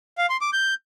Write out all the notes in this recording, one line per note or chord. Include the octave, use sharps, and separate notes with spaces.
F5
C6
D6
G6